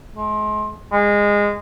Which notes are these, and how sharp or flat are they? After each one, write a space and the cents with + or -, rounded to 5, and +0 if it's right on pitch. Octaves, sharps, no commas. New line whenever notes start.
G#3 +35
G#3 -20